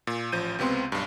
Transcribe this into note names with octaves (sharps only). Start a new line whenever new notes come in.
A#2
A1 F3 G6 D#7
C#2 C3 B3 C4 C6
B1 G2